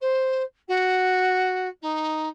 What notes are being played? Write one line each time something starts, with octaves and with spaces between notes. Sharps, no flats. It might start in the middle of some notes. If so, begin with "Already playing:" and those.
C5
F#4
D#4